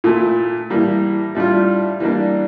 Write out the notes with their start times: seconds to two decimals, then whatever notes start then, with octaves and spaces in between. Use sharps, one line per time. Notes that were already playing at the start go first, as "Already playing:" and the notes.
0.04 A#2 A3 E4
0.70 A2 E3 G3 A#3
1.35 A2 G3 D4 F4
2.00 E3 G3 A#3 D4